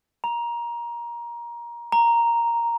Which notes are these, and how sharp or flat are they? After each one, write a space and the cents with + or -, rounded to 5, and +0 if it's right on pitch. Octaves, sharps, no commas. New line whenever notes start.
A#5 +20
A#5 +0